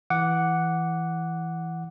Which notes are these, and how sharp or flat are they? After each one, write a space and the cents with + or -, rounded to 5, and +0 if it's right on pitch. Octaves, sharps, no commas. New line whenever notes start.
E3 +0 F#5 +0 D6 -10